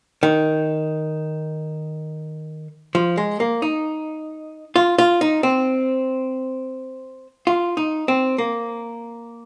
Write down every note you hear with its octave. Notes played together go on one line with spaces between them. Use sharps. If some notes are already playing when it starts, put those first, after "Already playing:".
D#3
F3
G#3
A#3
D#4
F4
F4
D#4
C4
F4
D#4
C4
A#3